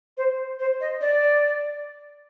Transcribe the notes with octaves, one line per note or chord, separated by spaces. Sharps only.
C5
C5
D#5
D5